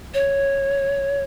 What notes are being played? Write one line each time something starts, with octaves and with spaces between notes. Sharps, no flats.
C#5